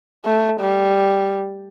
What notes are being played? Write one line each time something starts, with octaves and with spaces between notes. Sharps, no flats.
A3
G3